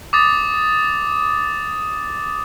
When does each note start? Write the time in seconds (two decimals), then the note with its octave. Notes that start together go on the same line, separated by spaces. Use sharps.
0.13 D6 D#6 A6